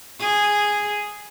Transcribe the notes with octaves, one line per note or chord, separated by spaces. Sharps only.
G#4